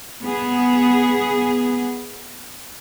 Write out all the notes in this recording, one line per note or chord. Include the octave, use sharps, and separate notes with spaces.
B3 G#4